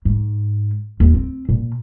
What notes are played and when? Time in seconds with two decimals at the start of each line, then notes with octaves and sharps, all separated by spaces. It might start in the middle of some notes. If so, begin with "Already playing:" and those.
0.05 G#2
1.00 D#2
1.14 C4
1.49 A#2